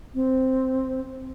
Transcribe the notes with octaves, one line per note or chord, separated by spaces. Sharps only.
C4